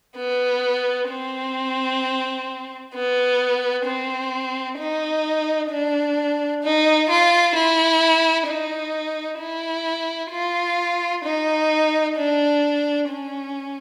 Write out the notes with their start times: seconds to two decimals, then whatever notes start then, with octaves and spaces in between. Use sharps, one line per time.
0.17 B3
1.09 C4
2.94 B3
3.86 C4
4.78 D#4
5.71 D4
6.63 D#4
7.09 F4
7.55 E4
8.48 D#4
9.40 E4
10.32 F4
11.24 D#4
12.17 D4
13.09 C#4